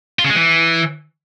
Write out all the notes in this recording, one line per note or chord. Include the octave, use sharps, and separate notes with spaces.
F4
C#3
G#3
E3